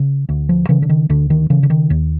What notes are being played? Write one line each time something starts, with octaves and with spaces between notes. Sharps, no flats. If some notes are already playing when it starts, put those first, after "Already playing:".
Already playing: C#3
D2
F3
C#3 E3
D3
D#3
D2 D3
D#3
C#3 E3
D3
D#3
D#2